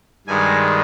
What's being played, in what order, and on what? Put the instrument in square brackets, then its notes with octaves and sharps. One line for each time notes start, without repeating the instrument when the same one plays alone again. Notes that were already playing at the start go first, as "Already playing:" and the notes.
[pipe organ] G2 D#3 G#3 G#5